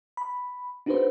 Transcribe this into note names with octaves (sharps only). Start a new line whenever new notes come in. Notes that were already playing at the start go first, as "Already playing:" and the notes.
B5
D4 D#4 F#4 G#4 B4 C5